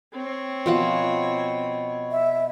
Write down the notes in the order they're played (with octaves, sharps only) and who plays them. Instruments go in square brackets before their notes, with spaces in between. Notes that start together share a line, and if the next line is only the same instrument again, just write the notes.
[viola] C4 C#5
[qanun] B2 F3 F#5
[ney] E5